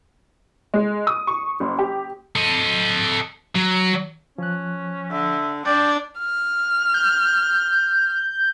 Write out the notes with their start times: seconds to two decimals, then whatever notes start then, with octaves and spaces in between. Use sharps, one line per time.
0.74 G#3
1.07 D#6
1.27 C#6
1.60 F#1
1.79 G4
2.36 A4 D#5
3.55 F#3
4.38 F3 C#4 F#6
5.11 D3 E5
5.65 D4 D5 G5
6.19 F6
6.94 G6